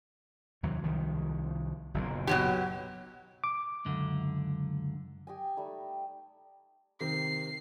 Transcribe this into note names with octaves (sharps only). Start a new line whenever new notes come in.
D#2 C3 F#3
C2 D#3 F3
F#1 B1 A#2
B2 F#3 G4
D6
C#2 F#2 D3
G4 D#5 G#5
G3 A3 D#4
C3 D#3 C7